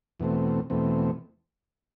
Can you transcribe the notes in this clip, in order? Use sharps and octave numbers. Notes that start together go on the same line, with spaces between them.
E2 B2 A3 C4
E2 B2 A3 C4